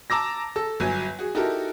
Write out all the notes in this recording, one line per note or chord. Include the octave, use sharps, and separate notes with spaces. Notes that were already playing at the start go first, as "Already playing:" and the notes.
A5 A#5 D6 E6 A#6
A4 E6
G1 F#3 G#5
F#4 G#4
D#4 E4 F#4 G4 A4 A#4